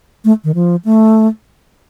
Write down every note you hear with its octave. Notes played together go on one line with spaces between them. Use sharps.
A3
D#3
F3
A3